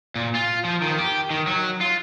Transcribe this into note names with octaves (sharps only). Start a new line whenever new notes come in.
A#2
F4
F3
D#3
G4
D#3
F#3
F4